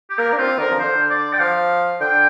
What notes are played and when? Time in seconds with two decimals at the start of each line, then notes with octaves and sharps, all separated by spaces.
0.10 G4
0.18 A#3 A#4
0.30 D4 G4
0.38 C4 F4
0.59 D3 A#4
0.71 F3
0.79 D3 C5
1.10 D5
1.33 G5
1.39 F3 F5
2.00 D3 G5